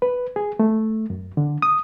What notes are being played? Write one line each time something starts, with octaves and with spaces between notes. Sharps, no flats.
B4
G#4
A3
F#2
D3
D#6